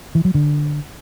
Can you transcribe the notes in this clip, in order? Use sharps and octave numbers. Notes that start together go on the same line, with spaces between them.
E3
F#3
D3